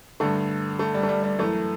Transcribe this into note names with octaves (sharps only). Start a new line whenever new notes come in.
G2 D3 A3
A3
G3
A3
G3
G3
F#2 E3 A3